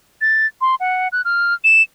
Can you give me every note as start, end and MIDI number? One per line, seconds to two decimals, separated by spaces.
0.21 0.47 93
0.61 0.75 84
0.80 1.08 78
1.12 1.22 90
1.25 1.54 89
1.64 1.82 100